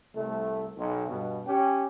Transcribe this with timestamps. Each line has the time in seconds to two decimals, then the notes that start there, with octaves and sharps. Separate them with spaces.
0.14 C2 A3
0.76 B1
1.08 G2 B2
1.46 C#4 G4